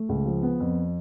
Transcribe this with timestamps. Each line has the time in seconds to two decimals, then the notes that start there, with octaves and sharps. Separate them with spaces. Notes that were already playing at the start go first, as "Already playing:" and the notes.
Already playing: A3
0.09 C#2
0.26 F3
0.42 B3
0.60 F2